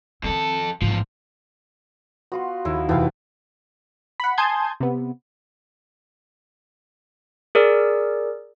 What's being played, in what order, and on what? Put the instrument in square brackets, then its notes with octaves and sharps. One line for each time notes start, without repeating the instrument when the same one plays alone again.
[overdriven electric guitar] F2 A4 [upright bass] D#3 C4
[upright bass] A1 G#2 [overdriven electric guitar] E2 F3
[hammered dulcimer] B3 F4 C6 [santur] F#4
[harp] D#2 [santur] E4
[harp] F2 C3 [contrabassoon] E3 [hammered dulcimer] A3 B3 G5 [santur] E5 F5
[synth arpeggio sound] F#5 B5
G#5 A5 C6 D#6 G6 G#6
C3 B3
[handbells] G#4 A#4 D5 E6